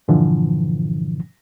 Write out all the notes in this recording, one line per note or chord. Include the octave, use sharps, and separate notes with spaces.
G2 A#2 D3 E3 F3